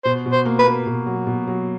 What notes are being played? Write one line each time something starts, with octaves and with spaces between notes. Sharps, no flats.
B2 C5
B2
C5
A#3
B4
A#3
B2
F#3
B2
F#3